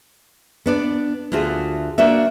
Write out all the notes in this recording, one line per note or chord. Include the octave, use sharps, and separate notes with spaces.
B3 D4 D5
D2 A3 F4 F#4 G#4
A#3 D4 F#4 D5 E5